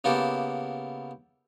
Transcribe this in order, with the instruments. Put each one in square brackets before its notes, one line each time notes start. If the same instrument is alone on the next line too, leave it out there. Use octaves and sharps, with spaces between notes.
[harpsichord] C#3 A#3 B3 E4 G4 A4